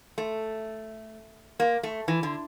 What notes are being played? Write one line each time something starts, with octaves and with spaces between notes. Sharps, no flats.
A3
A#3
A3
E3
D3